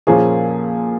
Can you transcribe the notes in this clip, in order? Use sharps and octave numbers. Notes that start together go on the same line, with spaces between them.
A#2 F3 A#3 C#4 G#4